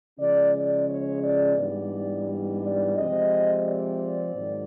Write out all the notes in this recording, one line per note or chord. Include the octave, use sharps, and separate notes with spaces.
C#3 F3 G#3 C#4 D5
D5
C#5
D5
G#2 E3 G3 B3 D4 D5
D5
C3 F3 G#3 C4 D#5
D5
G#2 D#3 F#3